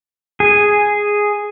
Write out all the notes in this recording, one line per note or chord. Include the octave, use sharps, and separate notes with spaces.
G#4